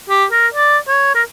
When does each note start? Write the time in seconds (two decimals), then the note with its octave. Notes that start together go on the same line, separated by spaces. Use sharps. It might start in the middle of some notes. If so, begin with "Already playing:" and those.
0.10 G4
0.32 A#4
0.54 D5
0.88 C#5
1.15 A#4